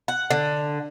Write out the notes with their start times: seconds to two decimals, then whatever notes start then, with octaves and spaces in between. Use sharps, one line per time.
0.08 F#5
0.30 D3